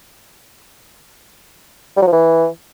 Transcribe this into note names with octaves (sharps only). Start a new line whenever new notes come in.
G3
F#3
F3
E3